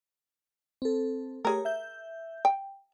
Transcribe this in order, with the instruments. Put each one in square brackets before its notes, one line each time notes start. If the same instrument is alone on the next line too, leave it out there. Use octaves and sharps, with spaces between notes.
[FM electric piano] C4 A4
[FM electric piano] A3 G4 C#5 [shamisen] G#4 A#4
[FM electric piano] E5 G6
[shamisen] G5